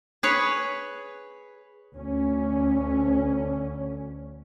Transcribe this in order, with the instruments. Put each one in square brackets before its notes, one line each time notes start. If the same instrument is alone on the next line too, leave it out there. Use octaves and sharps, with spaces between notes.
[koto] G#4 B4 C#5
[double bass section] D2 C#4